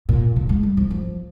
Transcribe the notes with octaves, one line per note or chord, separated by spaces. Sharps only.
A#2
D3
G#3
G3
F3
F3